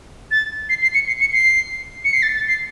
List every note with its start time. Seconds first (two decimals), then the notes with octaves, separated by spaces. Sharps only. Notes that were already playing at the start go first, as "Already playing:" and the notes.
0.31 A6
0.69 C7
0.82 C7
0.94 C#7
1.07 C7
1.21 C#7
1.33 C7
2.04 C#7
2.13 C7
2.23 A6
2.35 A6
2.48 C7